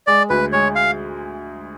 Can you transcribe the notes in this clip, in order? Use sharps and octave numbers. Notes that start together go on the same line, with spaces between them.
G#3 D5
D2 B4
G#3 C#5
F5